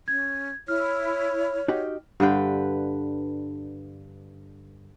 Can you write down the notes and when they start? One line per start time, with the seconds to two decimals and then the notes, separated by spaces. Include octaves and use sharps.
0.08 C#4 G#6
0.68 E4 C#5 F6
1.68 D#4 F#4 G4
2.20 G2 D3 B4 G5